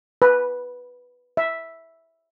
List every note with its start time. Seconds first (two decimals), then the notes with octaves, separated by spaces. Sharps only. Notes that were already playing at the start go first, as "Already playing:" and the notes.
0.22 B4
1.37 E5